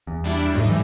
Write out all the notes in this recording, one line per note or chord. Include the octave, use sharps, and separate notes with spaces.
E2
G3 D4 E4
A2 F#3 D#4
A2 E3 G3